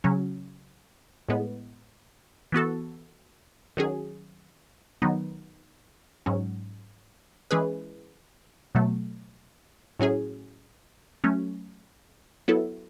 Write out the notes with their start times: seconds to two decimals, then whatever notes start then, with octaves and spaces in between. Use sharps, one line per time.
0.04 C#3 F#3 C#4
1.29 A2 G#3 B3
2.52 E3 B3 F#4 A4
3.77 D#3 F#3 C#4 G#4
5.02 D#3 F#3 B3 D#4
6.26 G#2 F#3 C#4
7.51 E3 G#3 C#4 G#4 B4
8.75 B2 F#3 A3
9.99 A2 F#3 C#4 G#4
11.24 F#3 A3 C#4
12.48 F#3 B3 E4 A4